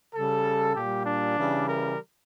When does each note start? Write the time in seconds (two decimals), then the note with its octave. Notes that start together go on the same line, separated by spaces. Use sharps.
0.14 C#3 G3 A4
0.74 A#2 G3 G4
1.04 D4
1.36 C#3 E3 G3
1.66 A#4